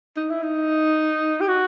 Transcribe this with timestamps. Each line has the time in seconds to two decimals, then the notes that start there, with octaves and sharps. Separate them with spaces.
0.16 D#4
0.30 E4
0.43 D#4
1.41 G4
1.48 F#4